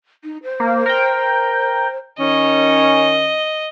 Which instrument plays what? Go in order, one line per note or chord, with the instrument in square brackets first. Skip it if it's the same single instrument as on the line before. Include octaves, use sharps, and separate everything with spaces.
[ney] D#4
C5
[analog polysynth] A#3
A#4 G5
[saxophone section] D#3 C#4 [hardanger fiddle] D#5